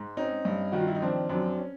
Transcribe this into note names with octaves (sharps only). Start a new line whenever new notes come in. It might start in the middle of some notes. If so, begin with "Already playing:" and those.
Already playing: G#2
C4 C#4 D#4
G2
D#3 F#4
F4
E4
D#4
F3 C4 D4
F#2 C4 D4
C#4